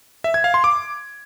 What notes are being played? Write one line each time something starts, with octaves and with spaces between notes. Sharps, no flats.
E5
G#6
F5
C6
D6